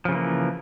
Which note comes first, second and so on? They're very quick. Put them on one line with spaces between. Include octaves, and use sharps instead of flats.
F3 C#3 E3 A#3